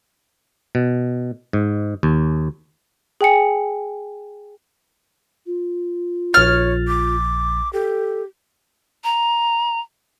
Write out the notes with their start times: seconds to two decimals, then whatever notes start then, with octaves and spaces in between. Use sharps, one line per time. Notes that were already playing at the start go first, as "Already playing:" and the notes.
0.75 B2
1.53 G#2
2.03 D#2
3.21 G#4 G5 G#5 C#7
5.46 F4
6.34 A#1 C#5 F6 A6
6.88 D6
7.73 G4 A4
9.04 A#5